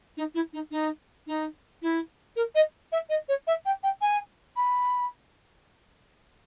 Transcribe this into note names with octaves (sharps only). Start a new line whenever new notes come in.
D#4
E4
D#4
D#4
D#4
E4
A#4
D#5
E5
D#5
C#5
E5
G5
G5
G#5
B5